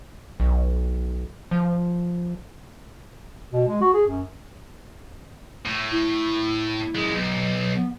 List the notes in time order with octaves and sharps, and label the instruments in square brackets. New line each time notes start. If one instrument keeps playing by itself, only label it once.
[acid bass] B1
F3
[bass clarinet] B2
G#3
F#4
G#4
F#2
[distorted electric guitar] A2
[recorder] E4
[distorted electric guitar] F#2 G#3
B1
[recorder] B3